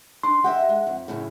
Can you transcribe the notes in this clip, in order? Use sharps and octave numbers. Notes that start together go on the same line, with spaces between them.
D4 C6
G4 D#5 E5 F#5
G#3
F2
F#2 A2 C#3